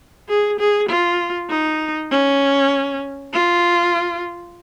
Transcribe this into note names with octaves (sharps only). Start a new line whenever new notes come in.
G#4
G#4
F4
D#4
C#4
F4